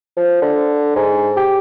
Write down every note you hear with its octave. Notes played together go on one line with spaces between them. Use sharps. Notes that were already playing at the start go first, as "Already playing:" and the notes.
F3
D3
G#2
G4